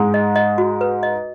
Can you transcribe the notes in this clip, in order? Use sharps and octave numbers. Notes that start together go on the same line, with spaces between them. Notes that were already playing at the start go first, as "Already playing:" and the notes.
Already playing: G#2 G#3
D#5
D#5
F#4
B4
D#5